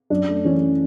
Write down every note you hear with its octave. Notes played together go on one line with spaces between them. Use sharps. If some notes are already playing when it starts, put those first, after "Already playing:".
F#2 D4
A3
E3 C#4